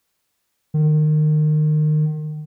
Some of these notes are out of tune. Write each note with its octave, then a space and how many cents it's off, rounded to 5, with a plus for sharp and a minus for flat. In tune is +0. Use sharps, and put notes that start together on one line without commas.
D#3 -30